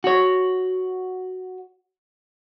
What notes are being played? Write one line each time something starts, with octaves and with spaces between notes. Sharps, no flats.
F#4 C#5